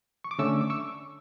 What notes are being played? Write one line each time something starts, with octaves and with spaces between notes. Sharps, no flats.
C#6
D6
D3 A3 C#4 C#6 E6
D6
C#6 E6